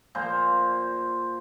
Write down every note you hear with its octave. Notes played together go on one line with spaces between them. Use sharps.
A#2 F3 C5